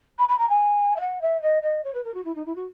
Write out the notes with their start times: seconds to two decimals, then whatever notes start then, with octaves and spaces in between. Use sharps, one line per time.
0.18 B5
0.29 B5
0.39 A#5
0.49 G#5
0.96 E5
1.00 F#5
1.21 E5
1.42 D#5
1.62 D#5
1.84 C#5
1.94 B4
2.04 A#4
2.14 F#4
2.25 E4
2.35 D#4
2.46 E4
2.56 F#4